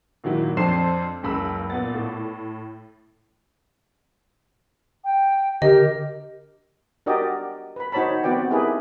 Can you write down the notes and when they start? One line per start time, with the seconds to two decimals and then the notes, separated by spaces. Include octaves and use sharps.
0.24 A#2 D#3 F#3 E4
0.57 F2 D4 C5 C6 C7 E7
1.23 F#1 C#2 B5 E6
1.70 A#2 B3 A6
1.94 A2
5.04 G5
5.62 D3 G4 A#4 D#5
7.06 D4 F#4 G4 A#4 D5 D#5
7.76 B4 B5
7.92 D#4 F#4 C5 C#5 A5 B5
8.23 B3 C4 F#4 B4 D5 G5
8.51 D#4 E4 G4 G#4 A#4 B4